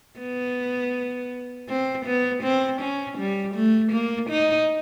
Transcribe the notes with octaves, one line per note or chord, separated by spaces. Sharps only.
B3
C4
B3
C4
C#4
G3
A3
A#3
D#4